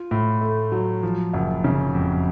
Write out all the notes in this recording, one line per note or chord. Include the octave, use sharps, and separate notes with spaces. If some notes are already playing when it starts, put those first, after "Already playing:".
Already playing: F4
A2
A3
F#3
F3
F#1
C#3
F2